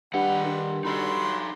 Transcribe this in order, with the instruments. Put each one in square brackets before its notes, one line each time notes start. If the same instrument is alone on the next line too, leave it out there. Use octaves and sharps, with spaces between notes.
[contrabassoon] G2 [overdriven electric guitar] D#3 F#5 [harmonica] D4 B4 G5
[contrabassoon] G2
[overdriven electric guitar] D#4 A4 [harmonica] F#4 B5 C6